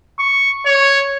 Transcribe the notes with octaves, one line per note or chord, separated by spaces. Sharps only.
C#6
C#5